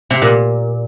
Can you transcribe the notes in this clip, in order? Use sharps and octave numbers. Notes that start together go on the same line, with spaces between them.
C3
A#2